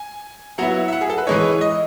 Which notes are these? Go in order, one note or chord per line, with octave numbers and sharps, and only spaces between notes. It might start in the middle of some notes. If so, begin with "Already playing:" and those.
Already playing: G#5
F#3 B3 E4 F#5
E5
F#5
G#4
A4
B4
E3 G#3 D#4 C#5
D#5